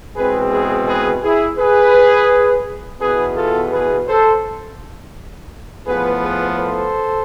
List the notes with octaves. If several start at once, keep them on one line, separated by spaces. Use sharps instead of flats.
E2 B2 G#3 C4 G#4 B4
G#4 B4
G#4 B4
E4 G#4
G#4 B4
E2 B2 B3 G#4 B4
F4 A4
G#4 B4
A4 C5
A2 F3 B3 G#4 B4
G#4 B4
A4 C5